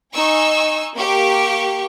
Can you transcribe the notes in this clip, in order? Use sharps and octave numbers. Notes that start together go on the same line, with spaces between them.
D#4 G#5 C#6 E6
A#3 G4 C#6